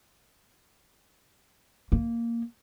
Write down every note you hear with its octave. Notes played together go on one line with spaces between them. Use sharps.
A#3